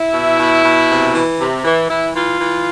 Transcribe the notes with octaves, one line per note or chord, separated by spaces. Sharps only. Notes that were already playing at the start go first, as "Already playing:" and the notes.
Already playing: E4
B2
B2
B2
C3
E3
C3
E3
E3 E4
E3 F4
E3